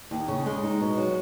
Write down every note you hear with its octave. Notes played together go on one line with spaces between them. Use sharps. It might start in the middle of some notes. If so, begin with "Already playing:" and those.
D#2
C#3
G#3
D#4
B2
F#3